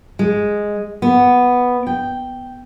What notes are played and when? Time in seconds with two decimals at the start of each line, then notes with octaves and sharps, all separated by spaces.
0.19 G#3
1.02 B3
1.87 G5